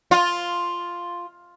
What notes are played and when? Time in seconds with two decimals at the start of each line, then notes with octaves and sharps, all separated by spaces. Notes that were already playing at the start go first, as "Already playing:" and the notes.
0.11 F4